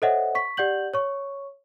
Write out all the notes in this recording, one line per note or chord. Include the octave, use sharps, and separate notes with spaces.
A4 C5 C#5 D#5 E5 F#5
C#6 B6
G4 D5 F#5 G6 F#7
C#5 C#6